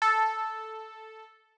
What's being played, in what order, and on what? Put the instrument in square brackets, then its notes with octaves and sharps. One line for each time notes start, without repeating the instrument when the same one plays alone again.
[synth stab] A4